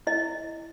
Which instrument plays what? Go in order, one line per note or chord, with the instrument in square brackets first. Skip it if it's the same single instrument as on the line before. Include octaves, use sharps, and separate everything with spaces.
[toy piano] E4 D#5